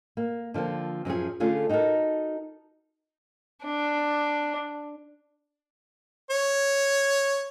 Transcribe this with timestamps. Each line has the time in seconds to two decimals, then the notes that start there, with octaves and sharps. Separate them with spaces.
0.17 A#3
0.54 D3 F3 A#3 C4
1.05 F#2 F3 C#4 G#4
1.40 D3 A3 C#4 F4 G#4 A4
1.69 D#4 F#4 G4 A4 A#4
3.64 D4
6.31 C#5